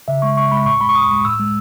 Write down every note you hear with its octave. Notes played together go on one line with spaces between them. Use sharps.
C#3 E5
G#3 C#6
C#3 C#6
G#3 B5
A2 C#6
G#3 B5
C#6
A2 D#6
G#3
A2 E6
G#3